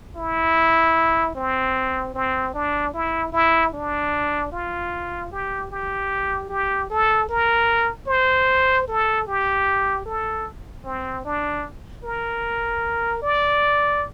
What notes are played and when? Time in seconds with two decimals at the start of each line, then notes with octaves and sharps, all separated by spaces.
0.16 E4
1.35 C4
2.14 C4
2.54 D4
2.94 E4
3.32 E4
3.73 D4
4.52 F4
5.32 G4
5.71 G4
6.49 G4
6.90 A4
7.29 A#4
8.08 C5
8.88 A4
9.27 G4
10.06 A4
10.85 C4
11.25 D4
12.04 A#4
13.22 D5